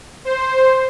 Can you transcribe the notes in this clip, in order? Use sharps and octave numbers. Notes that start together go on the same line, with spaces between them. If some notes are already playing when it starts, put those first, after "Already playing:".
C5